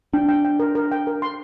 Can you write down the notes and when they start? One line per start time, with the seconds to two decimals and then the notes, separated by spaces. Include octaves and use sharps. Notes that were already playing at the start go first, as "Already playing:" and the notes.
0.14 D4 G5
0.29 G5
0.45 G5
0.60 A#4
0.75 A#4
0.92 G5
1.07 A#4
1.22 C6